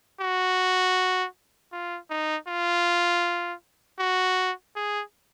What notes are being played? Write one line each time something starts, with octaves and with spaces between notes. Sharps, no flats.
F#4
F4
D#4
F4
F#4
G#4